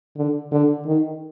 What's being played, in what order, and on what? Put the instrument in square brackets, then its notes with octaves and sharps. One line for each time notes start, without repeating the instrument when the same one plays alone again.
[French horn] D3
D3
D#3